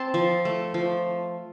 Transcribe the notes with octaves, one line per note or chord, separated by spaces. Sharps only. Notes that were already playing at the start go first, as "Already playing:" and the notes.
Already playing: C4 A5 C6
F3
A3
F3